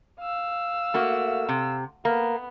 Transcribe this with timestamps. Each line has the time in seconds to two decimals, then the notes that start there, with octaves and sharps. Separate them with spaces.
0.19 F5 E6
0.94 A3 A#3 F#4
1.49 C3
2.05 A#3 B3